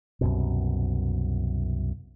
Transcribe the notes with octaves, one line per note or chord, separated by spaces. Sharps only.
C2 F#2 B2